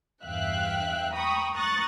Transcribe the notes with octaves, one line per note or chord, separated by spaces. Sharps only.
E2 G2 E5 F5 G5 F#6
G5 A#5 B5 C#6 D#6
A#5 C#6 D#6 F#6 A6